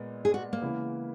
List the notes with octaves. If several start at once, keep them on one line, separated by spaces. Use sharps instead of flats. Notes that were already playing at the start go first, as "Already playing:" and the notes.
Already playing: A#2 G#3 B3
G#4
F#4
A#3
C#3 E3 G#3 B3 E4